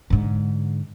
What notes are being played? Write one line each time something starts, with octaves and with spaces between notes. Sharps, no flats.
G#2 D3